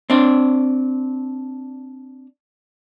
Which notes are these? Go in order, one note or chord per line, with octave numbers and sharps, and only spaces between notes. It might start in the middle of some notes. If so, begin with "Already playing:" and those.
C4 D4